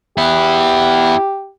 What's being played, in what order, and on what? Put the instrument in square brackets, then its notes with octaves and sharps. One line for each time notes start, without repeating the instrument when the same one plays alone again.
[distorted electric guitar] B3 E4 [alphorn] G4